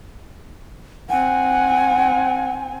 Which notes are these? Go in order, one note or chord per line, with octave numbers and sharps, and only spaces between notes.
C4 F#5 G#5